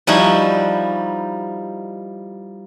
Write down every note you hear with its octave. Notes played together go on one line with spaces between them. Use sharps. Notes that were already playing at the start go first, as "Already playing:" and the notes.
F3 G3 D#4 E4 F#4